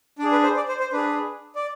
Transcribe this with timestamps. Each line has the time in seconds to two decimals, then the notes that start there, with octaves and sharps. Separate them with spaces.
0.19 D4 D5
0.24 G#4
0.32 B4
0.44 C5
0.56 D5
0.68 C5
0.80 C5
0.92 D4 G#4 B4
1.55 D5